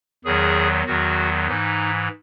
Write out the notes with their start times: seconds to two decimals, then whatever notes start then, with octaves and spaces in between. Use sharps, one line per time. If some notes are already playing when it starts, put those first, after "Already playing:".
0.25 E2 D#3 F#3 G#4
0.86 E2 D#3 F#3 F#4
1.47 G#2 E3 D#4